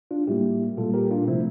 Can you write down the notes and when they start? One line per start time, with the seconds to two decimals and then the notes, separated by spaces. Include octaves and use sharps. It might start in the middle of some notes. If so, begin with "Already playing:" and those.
0.11 D4 F4
0.27 A2 G3 A#3 E4 G4
0.77 A#2 G3 A#3 F4 A4
0.94 G4 A#4
1.11 D4 F4
1.27 C3 F3 A3 C4 E4